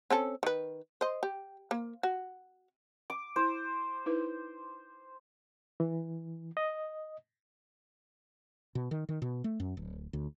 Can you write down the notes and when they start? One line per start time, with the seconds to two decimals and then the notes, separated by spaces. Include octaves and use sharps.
0.10 C4 C#4 A4
0.43 D#3 B4
1.01 C5 D#5
1.23 G4
1.71 A#3
2.03 F#4
3.10 D6
3.36 E4 C5
4.06 D#4 E4 B4
5.80 E3
6.57 D#5
8.75 B2
8.91 D#3
9.09 D#3
9.22 B2
9.44 A3
9.60 F#2
9.77 D1
10.13 D2